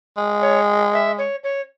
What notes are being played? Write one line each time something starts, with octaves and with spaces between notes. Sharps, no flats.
G#3
C#5
E5
C#5
C#5